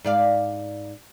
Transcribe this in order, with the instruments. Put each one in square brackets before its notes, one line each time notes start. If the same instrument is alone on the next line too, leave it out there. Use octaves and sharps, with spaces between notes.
[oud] G#2 D5 F5